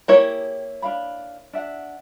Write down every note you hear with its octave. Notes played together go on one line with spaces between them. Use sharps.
A#3 E4 G4 G#4 C#5
D4 F5 B5
D4 E5 F#5